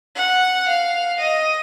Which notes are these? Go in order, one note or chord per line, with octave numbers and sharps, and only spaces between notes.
F#5
F5
D#5